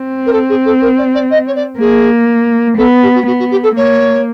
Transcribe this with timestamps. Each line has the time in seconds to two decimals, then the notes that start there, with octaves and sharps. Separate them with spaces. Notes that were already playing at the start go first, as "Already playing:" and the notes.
Already playing: C4
0.26 A#4
0.32 A4
0.49 G#4
0.65 A4
0.81 A#4
0.98 D5
1.14 D5
1.30 D#5
1.46 C#5
1.55 D5
1.79 A#3 G#4
2.78 B3 A4
3.02 G4
3.15 F#4
3.26 B3 F#4
3.39 F#4
3.51 G4
3.63 A4
3.76 A#3 C#5